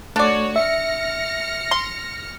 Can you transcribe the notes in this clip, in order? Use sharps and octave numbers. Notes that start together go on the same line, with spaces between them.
A3 D4 F#4 C#5 D5
E5 F6 A#6 C#7
C6